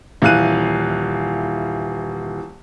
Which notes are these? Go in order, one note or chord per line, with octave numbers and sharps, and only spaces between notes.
D#1 E3 F5 F#6 D#7